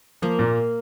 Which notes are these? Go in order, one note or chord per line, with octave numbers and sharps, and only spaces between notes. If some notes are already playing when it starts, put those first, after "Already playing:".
F3 A#3
A#2